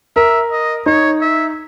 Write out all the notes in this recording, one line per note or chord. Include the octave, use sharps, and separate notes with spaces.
A#4 E5
D#5
D#4 C#5
E5